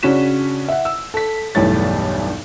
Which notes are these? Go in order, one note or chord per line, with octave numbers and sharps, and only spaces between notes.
C#3 C#4 D4 F#4 B6 E7
E5 F#5
E6
A4 B6
B1 E2 G2 A3 C#5 A6